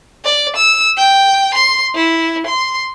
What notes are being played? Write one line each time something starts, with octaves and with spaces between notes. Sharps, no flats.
D5
E6
G5
C6
E4
C6